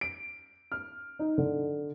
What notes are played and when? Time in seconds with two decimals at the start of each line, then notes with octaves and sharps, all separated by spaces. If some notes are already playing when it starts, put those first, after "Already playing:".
0.01 D7
0.72 F6
1.19 D#4
1.38 D3